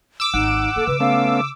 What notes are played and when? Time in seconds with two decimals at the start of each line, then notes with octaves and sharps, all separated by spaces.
0.20 D6 E6
0.34 G#1 D#4 F#5
0.76 A#3 A4
0.87 C#3 B4
1.00 A3 B3 C#4 F5